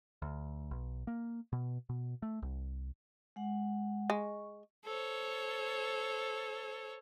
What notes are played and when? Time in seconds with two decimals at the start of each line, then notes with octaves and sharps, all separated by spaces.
0.22 D2
0.71 B1
1.07 A#3
1.53 B2
1.89 B2
2.22 A3
2.42 C2
3.36 G#3 F#5
4.10 G#3 C#6
4.84 A4 C5 C#5